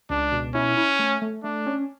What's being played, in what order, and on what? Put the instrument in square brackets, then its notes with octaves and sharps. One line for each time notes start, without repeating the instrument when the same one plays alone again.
[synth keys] C#2 [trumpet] D4
[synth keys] B2
[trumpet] C#4 [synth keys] E4
[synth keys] E4
A3
A3
[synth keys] A3 [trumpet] D4
[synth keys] C#4